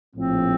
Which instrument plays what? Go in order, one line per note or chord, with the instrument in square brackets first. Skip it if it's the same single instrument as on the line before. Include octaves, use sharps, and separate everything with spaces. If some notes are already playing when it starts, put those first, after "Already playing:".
[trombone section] A#1 A2 F3 [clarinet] C4